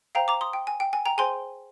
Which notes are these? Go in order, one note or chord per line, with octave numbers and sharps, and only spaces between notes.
C5 F5 G5 A#5
A#5 D6
C6 D#6
G5
G#5
G5
G#5
G5 A#5
G#4 C5 G5 G#5 C6